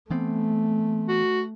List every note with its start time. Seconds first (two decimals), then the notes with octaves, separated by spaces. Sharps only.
0.10 E3 A3 B3 C4
1.08 F#4